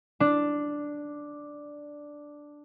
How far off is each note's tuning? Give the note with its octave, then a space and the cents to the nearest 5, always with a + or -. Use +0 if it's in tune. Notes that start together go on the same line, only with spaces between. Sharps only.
D4 +0